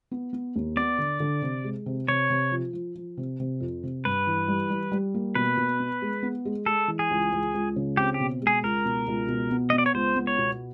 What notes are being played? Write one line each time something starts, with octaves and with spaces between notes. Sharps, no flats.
B3
B3
D#2
B3 D5
D3
D3
C3
G#3
C3
C3 C#5
C3
F3
F3
F3
C3
C3
F2
C3
G2 B4
E3
G3
G3
G3
A#3
B2 B4
B2
B3
G#3
B3
G#3
G#3 A4
E3
G#4
C#2
C#2
C#2
C#3
C4 G4
G4
B2
G#3
G#4
C#2 A#4
B2
C#2
B2
B3
B3 D#5
D5
C#5
C#2 C5
B3
C#5
B2